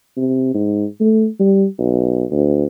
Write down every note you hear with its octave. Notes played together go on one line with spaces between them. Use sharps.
C3
G#2
A3
G3
B1
D2